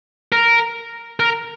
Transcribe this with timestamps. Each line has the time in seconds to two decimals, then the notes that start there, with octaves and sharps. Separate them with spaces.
0.32 A#4
1.20 A#4